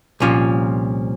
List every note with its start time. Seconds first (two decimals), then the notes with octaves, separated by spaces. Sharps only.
0.20 C2 A#2 F3 C#4